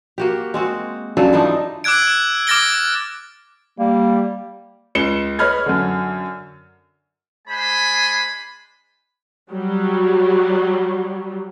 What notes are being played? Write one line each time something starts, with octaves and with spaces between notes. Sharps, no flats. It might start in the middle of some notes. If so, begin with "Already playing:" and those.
A#3 F#4 G4
G#3 C4 F#4
G2 C#3 F#3 A4
E3 F3 D4 D#4
D6 E6 F#6 G#6 D7
D6 F6 A6 A#6 D7 G7
G3 A#3
C#2 C#7 E7 G7
B4 C#5 D#5 B5 F6 G#6
F#2 D3
G#3 D4 C5 G#5 B5
F#3 G3